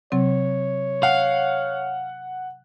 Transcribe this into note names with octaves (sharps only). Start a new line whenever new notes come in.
C3 F#3 C4 C#5
F5 F#5